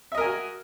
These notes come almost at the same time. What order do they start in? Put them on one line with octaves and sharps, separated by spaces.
E5 D#5 A#4 G#5 F#4